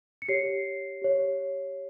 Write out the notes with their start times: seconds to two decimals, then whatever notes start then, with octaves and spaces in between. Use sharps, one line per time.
0.22 C#7
0.28 G4 C#5 C7
1.02 G4 C#5